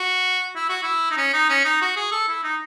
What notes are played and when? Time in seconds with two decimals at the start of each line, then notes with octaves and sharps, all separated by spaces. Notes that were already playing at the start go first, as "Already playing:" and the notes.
Already playing: F#4
0.55 E4
0.69 F#4
0.83 E4
1.11 D#4
1.17 C#4
1.33 D#4
1.49 C#4
1.65 D#4
1.81 F#4
1.97 G#4
2.12 A4
2.28 E4
2.44 D#4